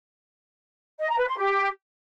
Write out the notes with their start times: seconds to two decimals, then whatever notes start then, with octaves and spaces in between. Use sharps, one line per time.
1.00 D#5
1.09 A#5
1.18 B4
1.27 C6
1.36 G4